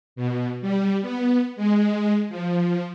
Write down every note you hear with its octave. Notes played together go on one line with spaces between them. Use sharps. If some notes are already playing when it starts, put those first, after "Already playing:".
B2
G3
B3
G#3
F3